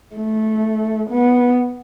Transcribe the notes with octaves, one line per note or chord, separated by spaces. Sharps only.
A3
B3